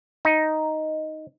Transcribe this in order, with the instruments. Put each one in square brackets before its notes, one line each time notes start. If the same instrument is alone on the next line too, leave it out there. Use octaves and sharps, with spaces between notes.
[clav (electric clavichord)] D#4